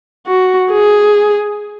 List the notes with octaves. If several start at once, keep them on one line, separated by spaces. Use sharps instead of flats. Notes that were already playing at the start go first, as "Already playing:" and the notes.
F#4
G#4